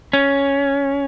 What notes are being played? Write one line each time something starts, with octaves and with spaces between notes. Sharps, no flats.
C#4